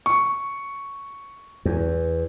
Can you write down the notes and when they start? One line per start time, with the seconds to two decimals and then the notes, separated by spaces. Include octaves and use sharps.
0.06 C#6
1.65 E2